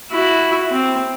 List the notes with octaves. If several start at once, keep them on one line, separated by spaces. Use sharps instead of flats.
E4 F#4
C4